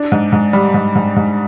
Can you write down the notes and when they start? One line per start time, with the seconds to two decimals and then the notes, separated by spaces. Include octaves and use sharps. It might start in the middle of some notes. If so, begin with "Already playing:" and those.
Already playing: D4
0.12 G#2
0.32 G#2
0.53 G3
0.74 G#2
0.95 G#2
1.16 G#2